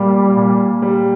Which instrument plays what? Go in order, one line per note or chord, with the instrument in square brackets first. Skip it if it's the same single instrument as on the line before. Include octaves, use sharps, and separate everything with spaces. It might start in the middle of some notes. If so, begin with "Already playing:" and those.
Already playing: [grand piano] A#2 A#3 [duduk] G3
[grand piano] A#2
G3